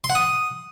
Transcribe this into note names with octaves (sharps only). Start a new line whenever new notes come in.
C6
F#5
D#6